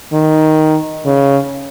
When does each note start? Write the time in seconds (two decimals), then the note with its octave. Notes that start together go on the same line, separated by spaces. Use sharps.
0.13 D#3
1.06 C#3